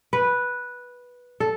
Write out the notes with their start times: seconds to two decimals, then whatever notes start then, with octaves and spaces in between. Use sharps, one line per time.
0.13 B4
1.40 A4